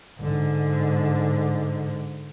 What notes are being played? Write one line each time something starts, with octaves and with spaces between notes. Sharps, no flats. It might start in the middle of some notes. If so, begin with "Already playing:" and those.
G#2 D3